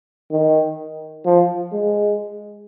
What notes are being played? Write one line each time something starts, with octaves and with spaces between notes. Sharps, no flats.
D#3
F3
G#3